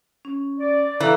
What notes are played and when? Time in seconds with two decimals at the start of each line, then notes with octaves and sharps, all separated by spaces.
0.25 C#4
0.59 D5
1.00 E3 A4 F5 A#5